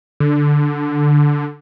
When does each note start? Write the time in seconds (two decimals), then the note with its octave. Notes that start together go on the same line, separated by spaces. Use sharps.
0.20 D3